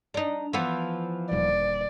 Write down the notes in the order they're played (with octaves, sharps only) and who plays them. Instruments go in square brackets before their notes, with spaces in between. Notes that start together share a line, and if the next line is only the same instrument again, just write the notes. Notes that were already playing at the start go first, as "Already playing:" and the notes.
[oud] D4 D#4
E3 F3 B3
[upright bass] D#1 D3 [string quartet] D5